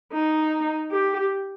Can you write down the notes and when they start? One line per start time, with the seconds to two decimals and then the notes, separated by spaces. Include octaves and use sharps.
0.13 D#4
0.91 G4